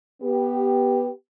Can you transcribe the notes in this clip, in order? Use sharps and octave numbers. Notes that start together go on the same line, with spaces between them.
B3 G4